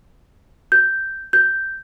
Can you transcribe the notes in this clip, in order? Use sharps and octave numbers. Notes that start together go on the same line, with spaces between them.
G6
G6